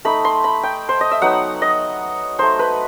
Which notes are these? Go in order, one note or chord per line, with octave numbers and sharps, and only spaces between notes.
A3 D#4 B5
C6
B5
G5
C5
D#5
E5
F#3 B3 D#4 F#5
D#5
A3 D#4 C5
B4